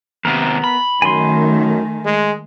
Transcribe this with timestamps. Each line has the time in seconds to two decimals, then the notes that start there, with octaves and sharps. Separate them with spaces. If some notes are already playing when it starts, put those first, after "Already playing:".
0.25 D#2 C3 B3 A#4
0.64 B5
1.02 F#2 D#3 A3 G#5 C6
2.05 G#3